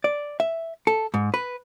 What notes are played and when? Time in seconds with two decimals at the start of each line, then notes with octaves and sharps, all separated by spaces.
0.04 D5
0.40 E5
0.87 A4
1.14 G#2
1.34 B4